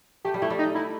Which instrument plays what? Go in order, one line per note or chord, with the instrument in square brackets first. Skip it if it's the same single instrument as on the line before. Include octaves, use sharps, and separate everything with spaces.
[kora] A3 [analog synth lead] G4
[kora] G3
[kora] A3 [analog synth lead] E4
[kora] G3
[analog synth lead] D#4
E4